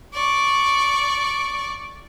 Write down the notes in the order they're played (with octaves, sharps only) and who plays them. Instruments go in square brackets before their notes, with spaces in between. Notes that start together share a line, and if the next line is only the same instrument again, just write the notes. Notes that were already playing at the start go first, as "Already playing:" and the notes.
[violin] D5 C#6